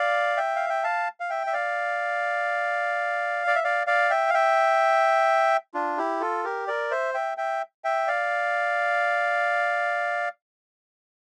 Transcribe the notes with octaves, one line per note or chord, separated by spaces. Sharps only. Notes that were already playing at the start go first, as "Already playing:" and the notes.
Already playing: D5 F5
E5 G5
F5
G5
F5 A5
F5
E5 G5
E5
D5 F5
D5
E5
D5 F5
D5 F5
E5 G5
F5
E5 G5
D4 F4
E4 G4
F4 A4
G4 A#4
A#4 D5
C5 E5
E5 G5
E5 G5
E5 G5
D5 F5